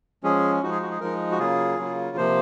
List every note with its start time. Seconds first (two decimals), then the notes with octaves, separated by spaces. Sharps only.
0.24 F3 G#3 C#4 G#4
0.63 F3 G#3 D#4 F#4
0.72 G#4
0.82 F#4
0.91 G#4
1.00 F3 G#3 D#4 A#4
1.31 F#4
1.39 C#3 F#3 A#3 F4 G#4
1.79 C#3 F#3 A#3 F4
2.17 C3 F3 A#3 C5